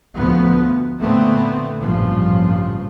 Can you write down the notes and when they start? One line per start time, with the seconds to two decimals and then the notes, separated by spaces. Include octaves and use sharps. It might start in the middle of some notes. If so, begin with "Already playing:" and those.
0.14 D2 F3 B3
1.00 A#2 D3 A3 B3 C4
1.80 A1 G2 A#2 C#3 F3